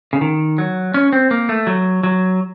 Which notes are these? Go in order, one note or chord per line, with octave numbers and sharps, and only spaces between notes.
C#3
D#3
F#3
C#4
C4
A#3
A3
F#3
F#3